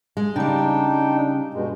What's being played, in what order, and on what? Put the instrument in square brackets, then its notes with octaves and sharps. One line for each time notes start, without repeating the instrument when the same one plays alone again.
[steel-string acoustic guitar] G#3
[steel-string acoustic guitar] C#3 G3 [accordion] D4 D#4 G5
[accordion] G2 B2 G#3